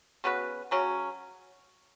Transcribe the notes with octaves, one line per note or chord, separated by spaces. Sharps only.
C#3 B3 F#4 B4
C#3 F#3 C#4